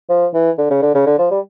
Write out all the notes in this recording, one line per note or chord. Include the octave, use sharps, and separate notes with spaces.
F3
E3
D3
C#3
D3
C#3
D3
F3
G3